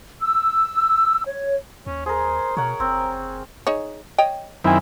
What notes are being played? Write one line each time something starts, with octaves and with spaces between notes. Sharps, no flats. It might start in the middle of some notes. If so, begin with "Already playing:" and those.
E6
C#5
D#2 C#4
G#4 A#4 C5
B2 A#4 C#5 F#5
F#1 C4
D#4 G#4 C#5
C#5 D#5 G5
F#2 D#3 C4 E4 G#5